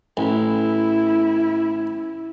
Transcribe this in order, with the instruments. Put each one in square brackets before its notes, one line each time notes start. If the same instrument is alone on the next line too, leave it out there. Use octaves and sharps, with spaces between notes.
[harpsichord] A1 [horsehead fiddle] E4